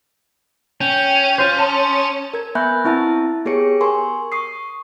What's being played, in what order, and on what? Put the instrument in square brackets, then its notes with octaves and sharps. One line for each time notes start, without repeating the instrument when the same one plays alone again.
[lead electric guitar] C#4 [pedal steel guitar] G5
[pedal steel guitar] F4 C5
A5 C6 D#6
[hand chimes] A#4 G#6
B3 E5 G#5 B5 F#6 G6
C4 E4 E5 A5
B3 G4 G#4 C#5 C#7
A#4 G#5 C6 C#6
C#6 D#6 C7